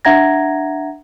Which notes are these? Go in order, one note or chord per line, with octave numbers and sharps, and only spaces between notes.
D4 E5 F#5 A#5 G#6 A#6